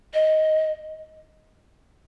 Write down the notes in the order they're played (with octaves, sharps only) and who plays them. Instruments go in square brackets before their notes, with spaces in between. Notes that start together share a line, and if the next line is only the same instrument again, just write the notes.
[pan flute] D#5